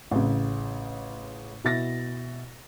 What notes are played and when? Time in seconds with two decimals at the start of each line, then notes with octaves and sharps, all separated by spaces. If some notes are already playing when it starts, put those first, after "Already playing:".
0.11 A1 C#3
1.64 B2 E4 A6 A#6